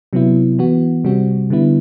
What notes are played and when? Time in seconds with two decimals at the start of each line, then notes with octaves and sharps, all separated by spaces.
0.13 C3 F#3 B3 E4
0.59 E3 B3 F#4
1.04 C3 G3 C4 F#4
1.50 D3 G3 B3 E4